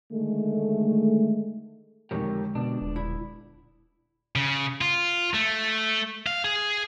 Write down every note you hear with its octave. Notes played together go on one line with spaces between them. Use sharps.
D3 D#3 G#3 A3
F2 D3 D#3 G#3 G4 A#4 C#5
B2 B3 D4
D#1
E4 D5 B5
C#3
F4
A3
F5
G#4